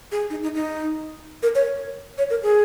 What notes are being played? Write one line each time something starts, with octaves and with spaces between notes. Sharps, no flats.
G#4
D#4
D#4
D#4
A#4
C#5
C#5
A#4
G#4